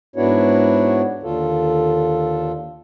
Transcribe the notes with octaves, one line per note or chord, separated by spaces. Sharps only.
G#2 B3 D4 E4 F#4 C#5
D#2 D3 F4 A4